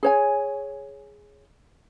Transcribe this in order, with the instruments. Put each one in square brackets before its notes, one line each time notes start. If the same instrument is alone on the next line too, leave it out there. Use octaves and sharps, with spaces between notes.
[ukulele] G#4 C#5 G#5